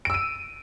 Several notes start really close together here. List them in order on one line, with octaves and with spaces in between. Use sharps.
D7 E6 D#7